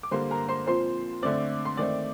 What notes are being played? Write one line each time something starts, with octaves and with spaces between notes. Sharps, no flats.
D6
D3 G3 A#3 C5 C6
A#4 A#5
C5 C6
A#2 F3 C4 C5 C6
D3 A3 C4 D5 D6
C6
D#3 A3 C4 D5 D6